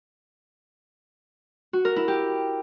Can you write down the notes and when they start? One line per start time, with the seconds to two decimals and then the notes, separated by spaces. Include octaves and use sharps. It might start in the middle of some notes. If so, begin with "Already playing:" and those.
1.73 F#4
1.85 A#4
1.96 E4
2.08 G4